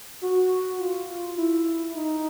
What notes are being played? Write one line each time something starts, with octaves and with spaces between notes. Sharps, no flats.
F#4
F4
E4
D#4